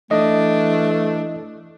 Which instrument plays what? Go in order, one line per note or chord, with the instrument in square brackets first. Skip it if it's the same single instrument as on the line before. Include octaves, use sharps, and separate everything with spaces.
[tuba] E3 [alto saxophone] A3 [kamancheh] D4 [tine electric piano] D#5